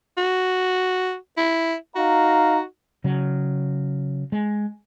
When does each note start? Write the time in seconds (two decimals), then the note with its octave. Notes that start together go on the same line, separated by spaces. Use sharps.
0.18 F#4
1.37 E4
1.96 D#4 F#4 F5 A#5
3.04 C#3 F#3
4.32 G#3